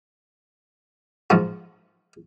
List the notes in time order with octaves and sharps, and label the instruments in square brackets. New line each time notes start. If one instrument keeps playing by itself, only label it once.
[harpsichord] G#2 F3 F#4